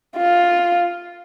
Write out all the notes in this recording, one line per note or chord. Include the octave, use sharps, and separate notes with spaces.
F4